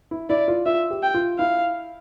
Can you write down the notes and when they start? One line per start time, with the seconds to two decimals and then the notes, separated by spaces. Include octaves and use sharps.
0.11 E4
0.30 E4 D5
0.48 F4
0.66 F4 E5
0.91 G4
1.03 G5
1.14 F4
1.39 E4 F5